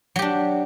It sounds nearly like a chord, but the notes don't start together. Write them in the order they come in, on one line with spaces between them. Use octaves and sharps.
F#3 G4 D4